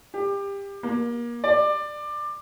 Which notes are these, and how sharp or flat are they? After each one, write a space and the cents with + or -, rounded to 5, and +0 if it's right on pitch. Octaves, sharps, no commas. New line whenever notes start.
G4 +25
A#3 +30
D5 +20